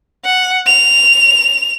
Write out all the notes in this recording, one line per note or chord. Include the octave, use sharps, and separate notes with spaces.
F#5
F7